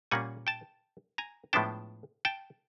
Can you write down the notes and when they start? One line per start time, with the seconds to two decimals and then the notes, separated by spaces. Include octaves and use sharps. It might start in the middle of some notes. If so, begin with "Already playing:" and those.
0.11 A#2 G3 A#3 C#4 F#5 G#5
0.47 G5 A5
1.18 G#5 A#5
1.53 A2 F3 G#3 B3 D4 G5 A5
2.25 G5 A5